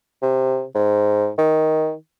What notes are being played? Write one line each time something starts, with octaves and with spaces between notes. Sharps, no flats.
C3
G#2
D#3